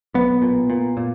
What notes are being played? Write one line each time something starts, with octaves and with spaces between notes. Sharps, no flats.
B1 B3
A#2
A#2
A#2